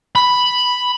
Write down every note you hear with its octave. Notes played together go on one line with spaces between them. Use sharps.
B5